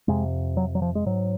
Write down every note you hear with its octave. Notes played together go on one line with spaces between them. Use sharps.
F2 C3 G#3
F#3
F#3
F3
G#3
G#2 F#3